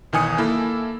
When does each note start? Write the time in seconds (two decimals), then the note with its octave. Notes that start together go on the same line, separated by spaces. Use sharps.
0.13 B1 D#3 E3 G#5 D#6 C#7
0.38 A#3 E4 A4